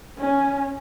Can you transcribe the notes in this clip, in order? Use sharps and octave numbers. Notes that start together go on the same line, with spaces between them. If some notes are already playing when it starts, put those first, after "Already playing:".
C#4